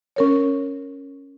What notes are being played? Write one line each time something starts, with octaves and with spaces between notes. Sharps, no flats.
C#4 A#4 C#5